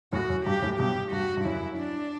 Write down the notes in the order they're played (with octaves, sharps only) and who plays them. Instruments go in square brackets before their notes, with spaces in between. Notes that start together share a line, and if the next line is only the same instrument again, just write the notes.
[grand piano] F#2 A2 [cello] F#4
[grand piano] F#2
[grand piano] G2 [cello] G4
[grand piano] F#2 A2
[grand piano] G2 B2 [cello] G4
[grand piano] G2 [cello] F#4
[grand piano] G2
[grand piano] F#2 [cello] E4
[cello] D4